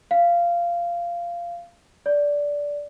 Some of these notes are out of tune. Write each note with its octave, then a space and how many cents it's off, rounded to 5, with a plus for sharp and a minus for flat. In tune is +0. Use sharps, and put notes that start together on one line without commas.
F5 -15
D5 -10